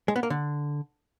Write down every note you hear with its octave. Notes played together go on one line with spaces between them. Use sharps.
G#3
B3
A#3
D3